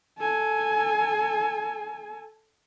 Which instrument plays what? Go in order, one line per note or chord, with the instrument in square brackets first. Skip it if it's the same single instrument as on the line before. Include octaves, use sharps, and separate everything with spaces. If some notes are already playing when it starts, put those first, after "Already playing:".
[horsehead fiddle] A4 G#5